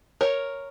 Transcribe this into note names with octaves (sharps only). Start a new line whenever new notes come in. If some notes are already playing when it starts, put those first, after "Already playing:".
A#4 C#5